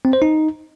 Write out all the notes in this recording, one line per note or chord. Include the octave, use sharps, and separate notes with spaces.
C4
C5
D#4